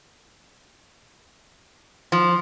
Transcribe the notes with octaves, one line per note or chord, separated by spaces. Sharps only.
F3